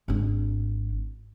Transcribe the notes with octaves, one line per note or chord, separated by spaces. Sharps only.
G#1 D4